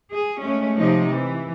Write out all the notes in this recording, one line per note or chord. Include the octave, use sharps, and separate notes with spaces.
G#4
G#3 A3 C#4
C3 F3 D#4
E3